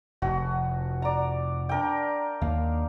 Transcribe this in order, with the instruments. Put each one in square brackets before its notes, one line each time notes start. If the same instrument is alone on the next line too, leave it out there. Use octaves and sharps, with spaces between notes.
[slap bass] F1 [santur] F#4
[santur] D5 A#5
D4 A#4 G5
[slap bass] D#2 A#3 [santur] F5